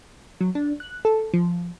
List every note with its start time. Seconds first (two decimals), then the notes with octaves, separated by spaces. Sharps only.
0.41 F#3
0.55 D4
0.80 F#6
1.05 A4
1.34 F3